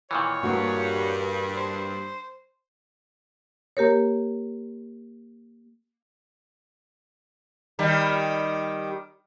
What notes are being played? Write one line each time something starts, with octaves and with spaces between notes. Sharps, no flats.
A#2 D#3 E3 C#5
G2 A#3 F#4
C5
A#3 G4 A#4 C#5
D#3 G3